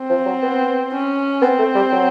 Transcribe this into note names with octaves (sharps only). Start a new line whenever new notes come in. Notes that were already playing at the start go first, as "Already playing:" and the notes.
Already playing: C4
F3
F#3
B3
C#4
B3 C4
A3
G3
F#3